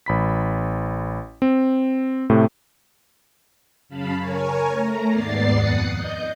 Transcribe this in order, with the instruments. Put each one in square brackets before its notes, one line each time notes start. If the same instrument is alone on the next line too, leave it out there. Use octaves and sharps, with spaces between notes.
[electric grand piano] A1 B5 B6
C4
A2 C3 A3
[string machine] F#2 C#3 F5 A5 B5
A#4 C#5 G#5
A3 A#5
D#2 G#2 B3 D5 A6 C7
F2 D#6 F#6 C#7
D#5 G6